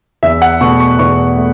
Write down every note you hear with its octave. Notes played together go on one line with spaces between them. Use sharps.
E2 E5
F#5
B2 A3 C#6
C#6
E2 C#6
A3